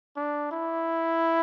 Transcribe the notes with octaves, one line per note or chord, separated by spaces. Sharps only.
D4
E4